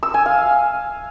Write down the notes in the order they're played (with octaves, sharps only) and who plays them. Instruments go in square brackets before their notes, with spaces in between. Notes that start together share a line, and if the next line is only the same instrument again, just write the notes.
[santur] E6
G#5
F5